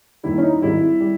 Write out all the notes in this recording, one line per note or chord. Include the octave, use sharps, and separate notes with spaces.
D#2 D#3 G3 E4
C#4
D#4
G#1 G#2 G3 E4
G3